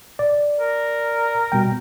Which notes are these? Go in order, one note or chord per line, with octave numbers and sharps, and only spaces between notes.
D5
A#4
B2 G3 G5